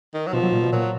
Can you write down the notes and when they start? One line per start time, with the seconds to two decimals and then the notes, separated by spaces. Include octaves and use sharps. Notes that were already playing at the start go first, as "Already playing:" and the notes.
0.14 D#3
0.27 F#3
0.33 B2 F3
0.43 F#3
0.52 A#2
0.62 B2
0.72 A#2 F#3